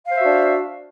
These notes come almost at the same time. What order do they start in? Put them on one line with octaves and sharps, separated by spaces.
F5 C5 E5 F#4 D4